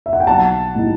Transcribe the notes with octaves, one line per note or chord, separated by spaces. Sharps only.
E5
F#5
G5
B1 F#5 A5
A2 G3 D#4